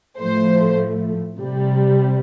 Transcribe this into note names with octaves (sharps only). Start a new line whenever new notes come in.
A2 F3 A3 C5
C3 G3